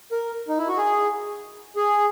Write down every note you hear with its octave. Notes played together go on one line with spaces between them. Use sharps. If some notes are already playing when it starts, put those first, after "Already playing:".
A#4
D#4
E4
F#4
G#4
G#4